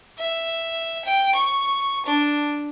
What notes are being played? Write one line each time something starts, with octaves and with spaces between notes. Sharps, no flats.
E5
G5
C#6
D4